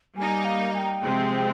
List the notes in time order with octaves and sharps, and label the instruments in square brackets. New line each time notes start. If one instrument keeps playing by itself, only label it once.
[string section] G3 A#3 D#4 [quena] G#5
[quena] F5
G#5
G5
[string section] C3 F3 G#3 C4